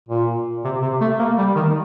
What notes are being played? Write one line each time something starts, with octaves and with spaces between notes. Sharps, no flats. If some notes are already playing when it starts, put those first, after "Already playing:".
A#2
C3
C3
A3
A#3
G3
D#3